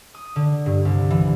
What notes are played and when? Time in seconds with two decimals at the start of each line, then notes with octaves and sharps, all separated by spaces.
0.14 D#6
0.36 D3
0.66 G2
0.85 C2
1.10 E3